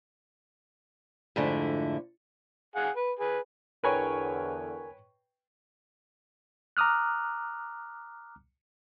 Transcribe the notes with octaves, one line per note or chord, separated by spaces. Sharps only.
F2 G#2 D3 A3 E4
G#4 F5 F#5
B4
G#4 B4
E2 D3 A#4 B4 C#5 G5 G#5
A#5 D6 D#6 F6 F#6